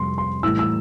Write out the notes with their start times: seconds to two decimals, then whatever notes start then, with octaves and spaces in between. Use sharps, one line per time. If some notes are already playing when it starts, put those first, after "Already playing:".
Already playing: F2 C3 G3 C6
0.18 C6
0.43 A2 E3 G3 E6
0.59 E6